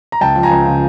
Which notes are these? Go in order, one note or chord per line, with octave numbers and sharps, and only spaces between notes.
A#5
C#2 G5 A5
F3
G#5 A#5
C#2
C#3